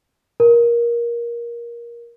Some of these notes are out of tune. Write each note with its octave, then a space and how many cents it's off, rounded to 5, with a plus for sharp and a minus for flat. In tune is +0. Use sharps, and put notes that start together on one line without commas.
A#4 +20